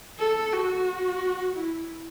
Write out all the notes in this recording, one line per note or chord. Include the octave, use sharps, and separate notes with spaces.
A4
F#4
E4